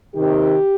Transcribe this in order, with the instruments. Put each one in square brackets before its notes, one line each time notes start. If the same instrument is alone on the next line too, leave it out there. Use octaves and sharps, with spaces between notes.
[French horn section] C3 D#3 G4